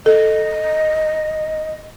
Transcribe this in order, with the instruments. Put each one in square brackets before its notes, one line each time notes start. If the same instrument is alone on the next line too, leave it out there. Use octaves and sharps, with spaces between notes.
[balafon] A4 [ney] D#5